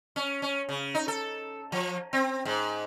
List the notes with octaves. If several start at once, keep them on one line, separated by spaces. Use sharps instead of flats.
C#4
C#4
C#3
D#4
A4
F3
C4
G#2